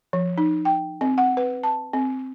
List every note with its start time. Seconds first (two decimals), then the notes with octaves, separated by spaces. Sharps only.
0.13 F3
0.38 D#4
0.65 G5
1.01 C4
1.18 F#5
1.37 B4
1.63 A5
1.93 C4